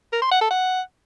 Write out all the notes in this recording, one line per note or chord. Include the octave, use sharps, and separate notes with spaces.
A#4
C6
F#5
A4
F#5